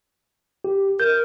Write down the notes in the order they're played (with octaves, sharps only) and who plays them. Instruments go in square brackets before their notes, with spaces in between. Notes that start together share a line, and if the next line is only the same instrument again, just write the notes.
[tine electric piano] G4
[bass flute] A#4 [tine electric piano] G6